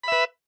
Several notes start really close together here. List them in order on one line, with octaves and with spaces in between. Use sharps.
B5 E5 B4